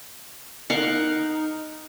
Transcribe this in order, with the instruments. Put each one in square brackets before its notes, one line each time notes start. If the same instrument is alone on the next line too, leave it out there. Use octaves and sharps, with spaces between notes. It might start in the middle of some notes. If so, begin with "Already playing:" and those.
[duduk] D#4 [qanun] A#4 F5 F#5